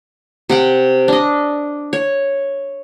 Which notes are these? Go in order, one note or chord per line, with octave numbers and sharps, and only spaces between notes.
C3 F#5 G5
D4 D#5
C#5